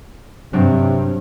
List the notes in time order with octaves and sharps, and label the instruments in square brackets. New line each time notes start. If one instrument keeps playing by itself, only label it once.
[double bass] G2 [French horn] C3 [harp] F#3 C4 D4